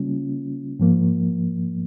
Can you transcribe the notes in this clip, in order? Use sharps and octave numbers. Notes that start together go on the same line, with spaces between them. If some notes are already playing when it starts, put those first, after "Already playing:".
Already playing: C#3 G3 A#3 C#4 F4
G#2 F3 A#3